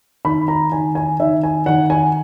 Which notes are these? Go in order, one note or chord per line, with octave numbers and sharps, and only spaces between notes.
D#3 B5
A#5
D#3 G#5
G#5
D#3 E5
G#5
D#3 F#5
G#5